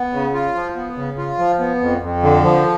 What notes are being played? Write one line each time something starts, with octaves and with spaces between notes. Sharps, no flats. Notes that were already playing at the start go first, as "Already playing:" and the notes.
Already playing: B3
C#3
F4
F3
B3
C#3
F4
F3
B3
F2
F2
D3
F3